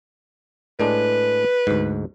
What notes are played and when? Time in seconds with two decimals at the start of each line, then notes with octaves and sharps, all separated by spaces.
0.80 A2 G#3 D4 B4
1.67 D2 G#2